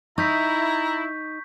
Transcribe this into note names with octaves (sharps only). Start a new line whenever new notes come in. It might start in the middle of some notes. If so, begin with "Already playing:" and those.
D#4 E4 A#5 C#6 G6 B6